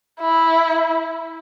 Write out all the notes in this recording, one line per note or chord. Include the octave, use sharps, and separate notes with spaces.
E4